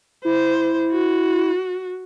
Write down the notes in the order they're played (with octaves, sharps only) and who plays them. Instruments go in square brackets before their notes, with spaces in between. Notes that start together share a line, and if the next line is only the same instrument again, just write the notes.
[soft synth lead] E4 [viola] C5
[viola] F#4